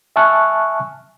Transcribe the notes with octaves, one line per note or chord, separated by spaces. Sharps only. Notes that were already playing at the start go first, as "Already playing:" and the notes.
E5 G#5 A5 C#6 F6 F#6